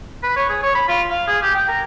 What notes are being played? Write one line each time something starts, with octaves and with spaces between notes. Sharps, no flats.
B4
C#5
G#4
C#5
B5
F4
F5
G#4
G4
G5
A#4